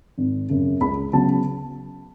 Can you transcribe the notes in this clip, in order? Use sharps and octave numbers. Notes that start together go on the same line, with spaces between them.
G#1
F#2 C#3
C#2 B5
C#3 F#3 B3 A5